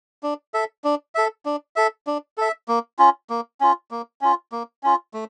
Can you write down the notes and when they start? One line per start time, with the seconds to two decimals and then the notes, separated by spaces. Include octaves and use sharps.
0.23 D4
0.54 A4 E5
0.84 D4
1.15 A4 E5
1.45 D4
1.76 A4 E5
2.07 D4
2.38 A4 E5
2.68 A#3
2.99 C#4 F4
3.30 A#3
3.61 C#4 F4
3.91 A#3
4.21 C#4 F4
4.52 A#3
4.83 C#4 F4
5.14 A3